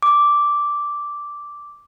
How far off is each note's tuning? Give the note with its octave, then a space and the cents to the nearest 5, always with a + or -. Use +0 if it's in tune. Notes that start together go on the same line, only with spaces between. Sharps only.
D6 -5